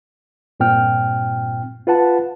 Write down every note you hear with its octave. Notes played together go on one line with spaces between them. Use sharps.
G2 A#2 C4 G5 F6
F4 B4 F#5 A5